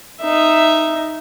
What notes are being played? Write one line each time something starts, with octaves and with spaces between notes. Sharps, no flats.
D#4 E5